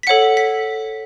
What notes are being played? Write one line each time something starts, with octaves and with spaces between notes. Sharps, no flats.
B6
A4 C#5 F#5 C#7
B6